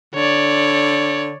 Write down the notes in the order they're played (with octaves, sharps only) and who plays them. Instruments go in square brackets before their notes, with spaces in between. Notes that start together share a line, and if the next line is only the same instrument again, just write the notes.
[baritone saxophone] D3 [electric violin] C#5 D5